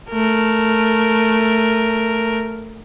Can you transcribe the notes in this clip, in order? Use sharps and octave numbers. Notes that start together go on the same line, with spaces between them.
A3 A#4